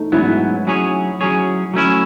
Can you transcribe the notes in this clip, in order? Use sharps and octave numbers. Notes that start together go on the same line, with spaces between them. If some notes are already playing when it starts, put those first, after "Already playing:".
Already playing: A3 D#4
G#2 F#3 B3 E4
F#3 C#4 G#4 C#5
F#3 C#4 G#4 C#5
F#3 A3 C#4 E4